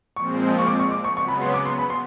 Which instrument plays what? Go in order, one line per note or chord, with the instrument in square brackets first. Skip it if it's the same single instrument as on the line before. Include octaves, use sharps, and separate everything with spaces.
[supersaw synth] A#2 F3 G#3 C4 [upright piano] C#6
[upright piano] C#6
D6
C#6
D6
C#6
[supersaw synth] C#3 F#3 B3 [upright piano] C#6
[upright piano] B5
C6
D6
C6
B5
C6